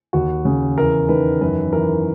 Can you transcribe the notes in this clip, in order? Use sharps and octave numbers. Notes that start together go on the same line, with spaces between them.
D#2 F#4
C#3
E2 A#4
D#3 B4
F#2 B4
E3 A#4